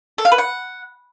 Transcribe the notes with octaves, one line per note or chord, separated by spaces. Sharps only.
A4
F5
B4
F#5